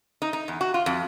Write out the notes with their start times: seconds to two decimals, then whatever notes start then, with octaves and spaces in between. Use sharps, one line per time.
0.22 D#4
0.33 D#4
0.48 E2
0.61 F#4
0.74 F4
0.86 F2